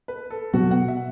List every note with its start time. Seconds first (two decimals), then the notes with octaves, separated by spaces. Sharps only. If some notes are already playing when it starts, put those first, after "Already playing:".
0.08 B4
0.30 A4
0.53 B2 F#3 B3 F#4
0.71 F#5
0.88 E5